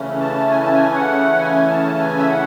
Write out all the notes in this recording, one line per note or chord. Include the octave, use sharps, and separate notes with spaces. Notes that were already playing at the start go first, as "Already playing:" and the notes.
Already playing: C#3 E3 A3 C#4
A5
G#5
A5
G#5
F#5
G#5
A5
G#5
E5
F#5